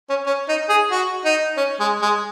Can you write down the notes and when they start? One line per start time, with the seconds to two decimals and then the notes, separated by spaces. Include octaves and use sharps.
0.10 C#4
0.27 C#4
0.49 D#4
0.70 G#4
0.91 F#4
1.25 D#4
1.57 C#4
1.80 G#3
2.02 G#3